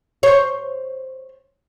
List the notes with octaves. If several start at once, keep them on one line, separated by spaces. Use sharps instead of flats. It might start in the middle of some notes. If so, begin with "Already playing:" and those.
C5 C#5